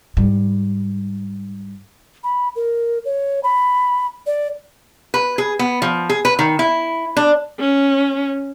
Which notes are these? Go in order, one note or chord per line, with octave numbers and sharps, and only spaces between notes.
G#2 G3
B5
A#4
C#5
B5
D5
B4
G#4
B3
F3
G#4
B4
D#3
E4
D4
C#4